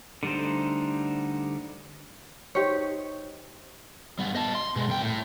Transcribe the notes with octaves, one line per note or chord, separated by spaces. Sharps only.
D3 G3 A3 D#4 C5
D#4 G4 C5 C#5
G3 B3
D#5 A5
C6
B2 G#3
C2 G5
A2